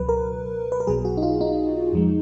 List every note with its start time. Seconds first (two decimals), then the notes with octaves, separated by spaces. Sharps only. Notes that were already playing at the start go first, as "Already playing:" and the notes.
Already playing: C#2 B2 F#3 B4
0.09 A#4
0.72 B4
0.80 A#4
0.87 B1 B2 F#3 G#4
1.05 F#4
1.17 D#4
1.23 F4
1.41 D#4
1.93 F2 F3 G#3